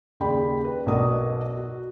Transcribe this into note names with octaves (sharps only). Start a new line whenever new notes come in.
D#2 C#3 G#4 D5 G5 B5
B4
B1 B2 F#3 A#4 D5 D#6
F#4